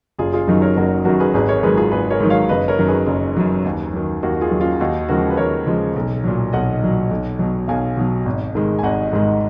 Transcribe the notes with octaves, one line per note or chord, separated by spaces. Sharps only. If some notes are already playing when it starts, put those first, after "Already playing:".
F#1 F4 G#4
F4 G#4
F#2 D#3 F#3 D#4
A#4 C#5
F#1 F#4 A#4
F#2 D#3 F#3 F#4 A#4
G#4 B4
G#1 G#4 B4
A#4 C#5
G#2 D#3 F#3 G#4 B4
F4 G#4
G#1 G#4 B4
A#4 C#5
G#2 D#3 F#3
C#5 F5
F#1 B4 D#5
A#4 C#5
F#2 D#3 F#3
G#4 B4
F#1
F#2 D#3 F#3
D#2
D#3 F#3
D#2 F#4 A#4
F4 G#4
D#3 F#3
C#4 F4
D#2 D#4 F#4
C#3 F3 G#3 F#4 A#4
B4
D#2 A#4 C#5
C#3 F3 G#3
B1
A#2 F#3
B1 D#5 F#5
A#2 F#3
B1
B2 F#3
B1 F5 G#5
B2 F#3
G#1
G#2 D#3 G#3
G#5
G#1 D#5 F#5
G#2 D#3 G#3